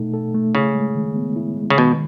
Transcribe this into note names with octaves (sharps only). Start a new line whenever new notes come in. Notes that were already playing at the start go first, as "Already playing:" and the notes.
Already playing: B2 A3 D#4 A4
A4
A3
C#3 E4
G#3
D#3
B3
E4
G#3
C#3
B2 D#3